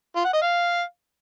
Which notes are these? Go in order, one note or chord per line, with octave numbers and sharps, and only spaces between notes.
F4
F#5
D#5
F5